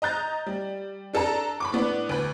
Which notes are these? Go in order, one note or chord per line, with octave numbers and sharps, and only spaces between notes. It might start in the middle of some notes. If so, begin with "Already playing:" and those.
D#5 A#5 G6 A6
G3
D4 A4 A5 A#5
B5 C#6 D6
A2 B3 D4
D2 B4